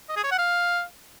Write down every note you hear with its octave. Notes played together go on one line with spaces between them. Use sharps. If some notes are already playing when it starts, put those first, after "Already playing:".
D#5
G#4
C#5
F#5
F5